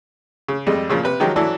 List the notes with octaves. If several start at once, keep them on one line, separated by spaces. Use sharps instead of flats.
C#3
F2 G3 G#3
A#2 C#3 F3
C3 B4
D#3 F3 F#3 G#3 G4
E3 F#3 D4 E4 A4